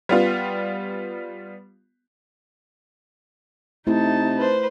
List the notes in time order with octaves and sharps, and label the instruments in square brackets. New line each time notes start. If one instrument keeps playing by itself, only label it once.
[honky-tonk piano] G3 B3 F4
[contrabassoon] C3 [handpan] A3 E4 [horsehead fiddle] D#4 A5
[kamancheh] B4 C5